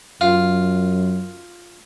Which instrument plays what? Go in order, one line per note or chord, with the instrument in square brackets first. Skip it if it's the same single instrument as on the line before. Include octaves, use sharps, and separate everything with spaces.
[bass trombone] F#2 [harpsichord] F4